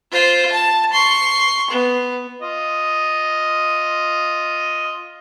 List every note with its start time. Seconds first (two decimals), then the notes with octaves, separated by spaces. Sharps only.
0.12 F4 C5
0.52 A5
0.93 C6 C#6
1.70 B3
2.42 F4 D#5